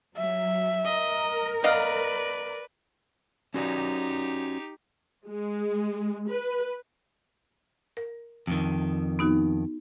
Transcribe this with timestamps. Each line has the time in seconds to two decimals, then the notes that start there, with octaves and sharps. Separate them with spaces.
0.17 F#3 E5
0.85 A#4 D#5
1.64 B3 B4 D5 D#5 F5
3.54 C#4 D#4 F#4 G4 D5
5.27 G#3
6.29 B4
7.97 A#4
8.47 F2 D#3
9.19 B3 D#4 F#4